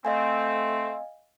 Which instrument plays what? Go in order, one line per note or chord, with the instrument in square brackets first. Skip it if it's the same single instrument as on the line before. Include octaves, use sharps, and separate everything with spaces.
[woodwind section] A3 C4 [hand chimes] D#5 F5 G#5